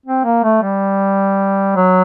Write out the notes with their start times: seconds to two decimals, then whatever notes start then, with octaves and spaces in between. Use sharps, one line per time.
0.06 C4
0.24 A#3
0.44 A3
0.62 G3
1.76 F#3